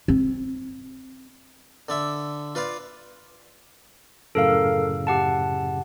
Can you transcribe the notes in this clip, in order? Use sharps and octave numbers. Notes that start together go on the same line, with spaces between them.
C4
D3 D5 E5
F4 B4 D5 F5
F#2 A2 C#3 A4 A#4 F5
G4 F#5 A5